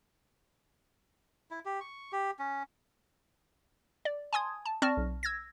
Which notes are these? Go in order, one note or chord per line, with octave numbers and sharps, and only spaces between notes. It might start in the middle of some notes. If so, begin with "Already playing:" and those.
E4
G4
C#6
G4
C#4
D5
G#5 A5 C6 D#6 G#6
A5
C4 D5 A5 C#6 F6 A#6
B1
E6 G#6 A#6